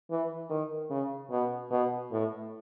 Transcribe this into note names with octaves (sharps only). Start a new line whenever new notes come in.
E3
D#3
C#3
B2
B2
A2